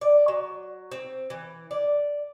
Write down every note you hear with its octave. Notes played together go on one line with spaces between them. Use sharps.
D5
F#3
C4
E3
D5